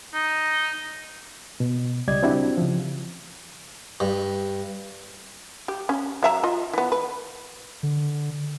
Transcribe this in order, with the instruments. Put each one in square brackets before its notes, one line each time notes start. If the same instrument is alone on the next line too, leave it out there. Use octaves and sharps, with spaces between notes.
[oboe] D#4
[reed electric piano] B2
C#2 G3 D5 D#5 G#6
C4 D4 E4 F#4 G4
C#3 F3
[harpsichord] G2
[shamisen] G4
C#4
F#3 E5 A#5
F4 D#5
E3 B3
B4
[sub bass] D3